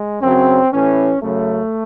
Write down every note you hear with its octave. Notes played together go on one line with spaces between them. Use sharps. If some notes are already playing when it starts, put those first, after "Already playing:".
Already playing: G#3
F#2 C#3 F#3 C4
A2 E3 C#4
F#2 C#3 F#3 A3